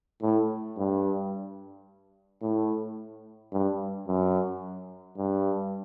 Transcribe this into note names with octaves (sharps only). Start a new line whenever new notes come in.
A2
G2
A2
G2
F#2
G2